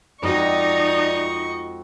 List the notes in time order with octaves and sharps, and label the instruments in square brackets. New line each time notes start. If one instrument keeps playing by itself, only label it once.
[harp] F2 G#3 F#4 [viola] D#4 D#5 [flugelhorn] D5 [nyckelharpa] C#6